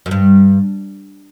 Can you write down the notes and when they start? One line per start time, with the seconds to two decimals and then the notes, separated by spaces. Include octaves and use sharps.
0.06 F#2
0.11 G2